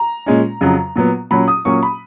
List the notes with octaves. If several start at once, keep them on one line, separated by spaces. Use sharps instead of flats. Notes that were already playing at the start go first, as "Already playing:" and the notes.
Already playing: A#5
A#2 G#3 C#4
F2 C#3 F#3
A#2 F#3 B3
A#2 F#3 C#4 B5
D#6
A#2 F#3 A#3 C#4 C#6
B5